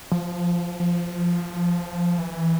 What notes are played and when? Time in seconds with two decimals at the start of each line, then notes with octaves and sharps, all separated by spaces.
0.12 F3
0.80 F3
2.19 E3